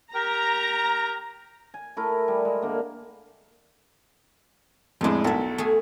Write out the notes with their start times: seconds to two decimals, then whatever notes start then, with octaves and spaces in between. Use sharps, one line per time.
0.14 G4 A#4 A#5
1.74 G#5
1.97 A3 E4 A#4
2.28 G3 G#5
2.45 G#3
2.62 D3 A#3
5.01 F2 A2 F3 G#3 D4
5.24 B1 A4 A#4 E5
5.58 A3 G#4